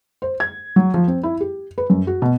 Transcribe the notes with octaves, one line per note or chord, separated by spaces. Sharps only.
C5
G#6
F#3
F3
C4
E4
G4
B4
F#2
F#4
B2